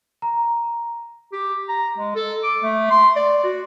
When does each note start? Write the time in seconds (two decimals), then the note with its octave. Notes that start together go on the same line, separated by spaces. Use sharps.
0.22 A#5
1.32 G4
1.69 A#5
1.98 G#3
2.15 A4
2.43 D6
2.62 A3
2.90 C6
3.16 D5
3.44 F#4